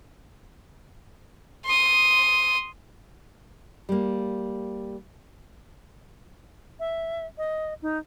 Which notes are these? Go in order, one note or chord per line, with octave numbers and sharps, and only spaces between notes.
C6 D#6
G3 A#3
E5
D#5
D#4